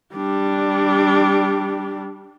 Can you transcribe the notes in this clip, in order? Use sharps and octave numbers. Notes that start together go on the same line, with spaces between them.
G3 D4